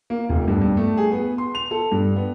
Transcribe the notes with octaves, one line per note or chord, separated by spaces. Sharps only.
A#3
F1
G2
G2
A3
G#4
B3
C6
F7
A4
G2
B3